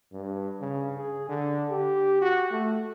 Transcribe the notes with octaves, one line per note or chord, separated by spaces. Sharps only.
G2
C#3
G#4
D3
G4
F#4
A3